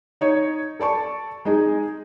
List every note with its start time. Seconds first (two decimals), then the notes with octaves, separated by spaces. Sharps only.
0.21 D#4 C#5
0.80 A4 D5 A5 C#6
1.45 G#3 D#4 G#4